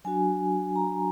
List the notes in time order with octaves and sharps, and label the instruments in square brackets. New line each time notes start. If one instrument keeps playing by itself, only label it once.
[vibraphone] F#3 D4 F#4 G#5
A#5